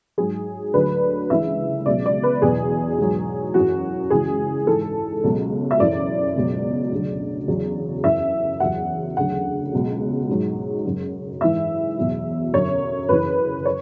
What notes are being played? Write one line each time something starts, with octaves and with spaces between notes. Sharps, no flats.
G#2 F#3 G#4
D2 D3 F#3 B4
C#2 C#3 E3 E5
C#2 B2 F#3 D5
D5
B4
E2 B2 F#3 G#4
G#2 F#3
F#2 E3 F#4
C#2 C#3 E3 G#4
G#2 E3 A4
C#2 B2 F#3
E5
F#2 E3 D5
C#2 B2 F#3
D2 C#3 F#3
E2 C#3 F#3
F#2 E3 E5
E2 C#3 F#3 F#5
D2 C#3 F#3 F#5
C#2 B2 F#3
G#2 F#3
F#2 C#3 F#3
G#2 E3 E5
E2 B2 F#3
F#2 D3 F#3 C#5
F#2 C#3 E3 B4
C#5